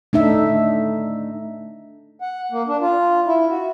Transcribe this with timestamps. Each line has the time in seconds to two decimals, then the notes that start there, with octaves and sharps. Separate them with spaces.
0.13 A3 D4 D#4 E5
2.20 F#5
2.52 A#3
2.67 D4
2.81 F4
3.27 E4
3.50 F#4